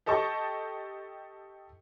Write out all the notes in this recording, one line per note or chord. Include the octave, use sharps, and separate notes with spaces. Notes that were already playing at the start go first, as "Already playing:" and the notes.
G4 A4 D#5 A5 C#6